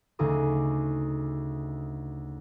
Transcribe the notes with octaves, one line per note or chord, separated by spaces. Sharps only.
D2 C#3 D#4 G#4 D6